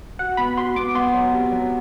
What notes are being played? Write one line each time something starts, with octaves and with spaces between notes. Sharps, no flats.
F#4 F#5
B3 B5
F#4 C6
B3 D6
B3 C6
F#3
C3
F#3